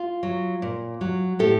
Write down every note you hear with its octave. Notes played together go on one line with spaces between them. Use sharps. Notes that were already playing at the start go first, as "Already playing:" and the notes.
Already playing: F4
F#3
A#2
F#3
A2 G4 A4